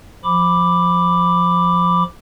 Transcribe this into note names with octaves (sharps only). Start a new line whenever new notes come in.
F3 B5 D6